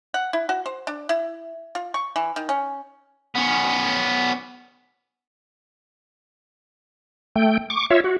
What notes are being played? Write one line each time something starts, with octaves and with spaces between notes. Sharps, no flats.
F#5
E4
F#4
C5
D4
E4
F4
C#6
E3
D#3
C#4
B3 C#4
A3 G5
C#6 D6
F4 C#5 E5
F#4